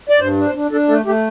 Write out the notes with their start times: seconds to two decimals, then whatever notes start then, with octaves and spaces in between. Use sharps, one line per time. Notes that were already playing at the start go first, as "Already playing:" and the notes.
0.09 D5
0.20 G2 C5
0.38 D4
0.46 C5
0.55 D4
0.71 D4 A4
0.88 A3 A4
1.05 A3 G4